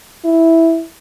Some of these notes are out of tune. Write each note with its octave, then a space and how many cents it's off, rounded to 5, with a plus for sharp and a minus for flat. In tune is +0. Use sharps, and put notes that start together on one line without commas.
E4 -5